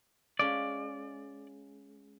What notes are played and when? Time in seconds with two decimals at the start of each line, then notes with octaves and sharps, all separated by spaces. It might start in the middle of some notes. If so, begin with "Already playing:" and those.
0.39 G#3 C#4 F4 D5